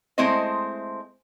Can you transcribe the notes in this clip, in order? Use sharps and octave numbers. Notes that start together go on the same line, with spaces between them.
G#3 A3 C4 E4 C5 D#5